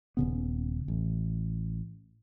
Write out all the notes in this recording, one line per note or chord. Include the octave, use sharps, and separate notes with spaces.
D#1 C#3 B3
A1